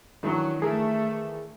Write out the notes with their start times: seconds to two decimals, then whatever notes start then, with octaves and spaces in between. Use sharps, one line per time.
0.23 D#3 E3 F#3 D4
0.62 A3 G#4 A#4